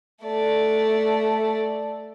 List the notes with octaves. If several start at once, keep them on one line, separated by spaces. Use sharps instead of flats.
A3 D5